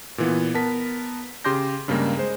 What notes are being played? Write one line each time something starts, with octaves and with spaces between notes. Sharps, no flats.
A#2 E3 B3
B3 A#4 A5 B6
C#3 G4 C6 D6 G6 A#6
G2 C#3 G3 G#3 A#3
G#3 C5